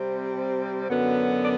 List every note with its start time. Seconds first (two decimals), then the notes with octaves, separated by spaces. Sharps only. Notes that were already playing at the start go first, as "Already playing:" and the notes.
Already playing: C3 G3 C4
0.90 F#2 D3 F#3 B3
1.42 D5